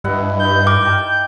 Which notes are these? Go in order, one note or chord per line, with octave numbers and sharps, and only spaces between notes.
G2 E4 D#5 F#5
D#4 E4 G6
A#4 D6
G5 A5 A#5